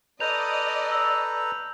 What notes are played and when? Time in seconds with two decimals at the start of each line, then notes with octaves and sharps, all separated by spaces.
0.20 A4 B4 D5 D#5 A#5 G6 F7
0.91 E6